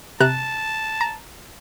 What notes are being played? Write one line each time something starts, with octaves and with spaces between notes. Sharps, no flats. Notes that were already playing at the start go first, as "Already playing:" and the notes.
C3 A5 A#5 F#6
A#5